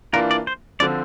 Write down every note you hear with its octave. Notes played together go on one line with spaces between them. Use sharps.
E3 A#3 D4 F4 A#4
D5
C5
D3 F3 C4 D5